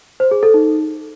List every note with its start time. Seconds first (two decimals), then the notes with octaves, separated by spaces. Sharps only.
0.20 C5
0.31 G#4
0.43 A4
0.54 D#4